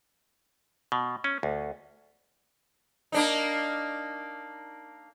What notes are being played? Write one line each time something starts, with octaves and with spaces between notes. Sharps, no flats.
B2
C#4
D2
A#3 D4 D#4